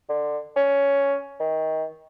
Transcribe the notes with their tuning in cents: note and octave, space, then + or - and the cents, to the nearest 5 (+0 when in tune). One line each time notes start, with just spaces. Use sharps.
D3 +20
C#4 +10
D#3 +25